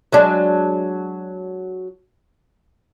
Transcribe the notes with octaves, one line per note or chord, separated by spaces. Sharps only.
F#3 G#3 D4